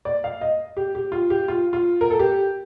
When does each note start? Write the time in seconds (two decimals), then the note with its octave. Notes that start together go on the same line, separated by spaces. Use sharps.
0.05 D5
0.24 F5
0.41 D#5
0.77 G4
0.95 G4
1.12 F4
1.30 G4
1.48 F4
1.73 F4
2.01 A#4
2.10 A4
2.19 G4